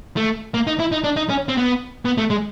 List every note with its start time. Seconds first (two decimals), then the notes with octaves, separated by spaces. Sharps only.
0.17 A3
0.54 A#3
0.67 D#4
0.80 E4
0.92 D#4
1.04 D4
1.16 D#4
1.29 C#4
1.48 C4
1.57 B3
2.05 B3
2.18 A3
2.30 G#3